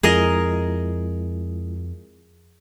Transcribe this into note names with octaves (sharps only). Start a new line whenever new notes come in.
F2 G#3 E4 F4 G#4 A#4 D#5